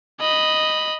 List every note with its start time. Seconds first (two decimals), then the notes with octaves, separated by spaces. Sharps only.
0.20 D#5 B5